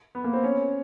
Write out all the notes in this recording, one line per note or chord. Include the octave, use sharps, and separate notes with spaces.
B3
A#3
C4
C#4